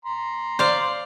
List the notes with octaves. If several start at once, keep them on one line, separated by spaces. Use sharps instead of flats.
A#5 C6
C5 D5 F5